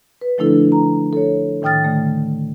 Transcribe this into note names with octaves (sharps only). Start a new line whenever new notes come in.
B4
D3 F3 A3 D4 E4 A4
A#5
A4 C#5
A2 D#3 G5 D#6 F6 A6
D3 A3